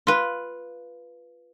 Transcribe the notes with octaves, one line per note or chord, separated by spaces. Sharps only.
F4 B4